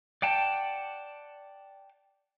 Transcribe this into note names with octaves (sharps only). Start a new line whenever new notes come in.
D5 F#5 G5 A5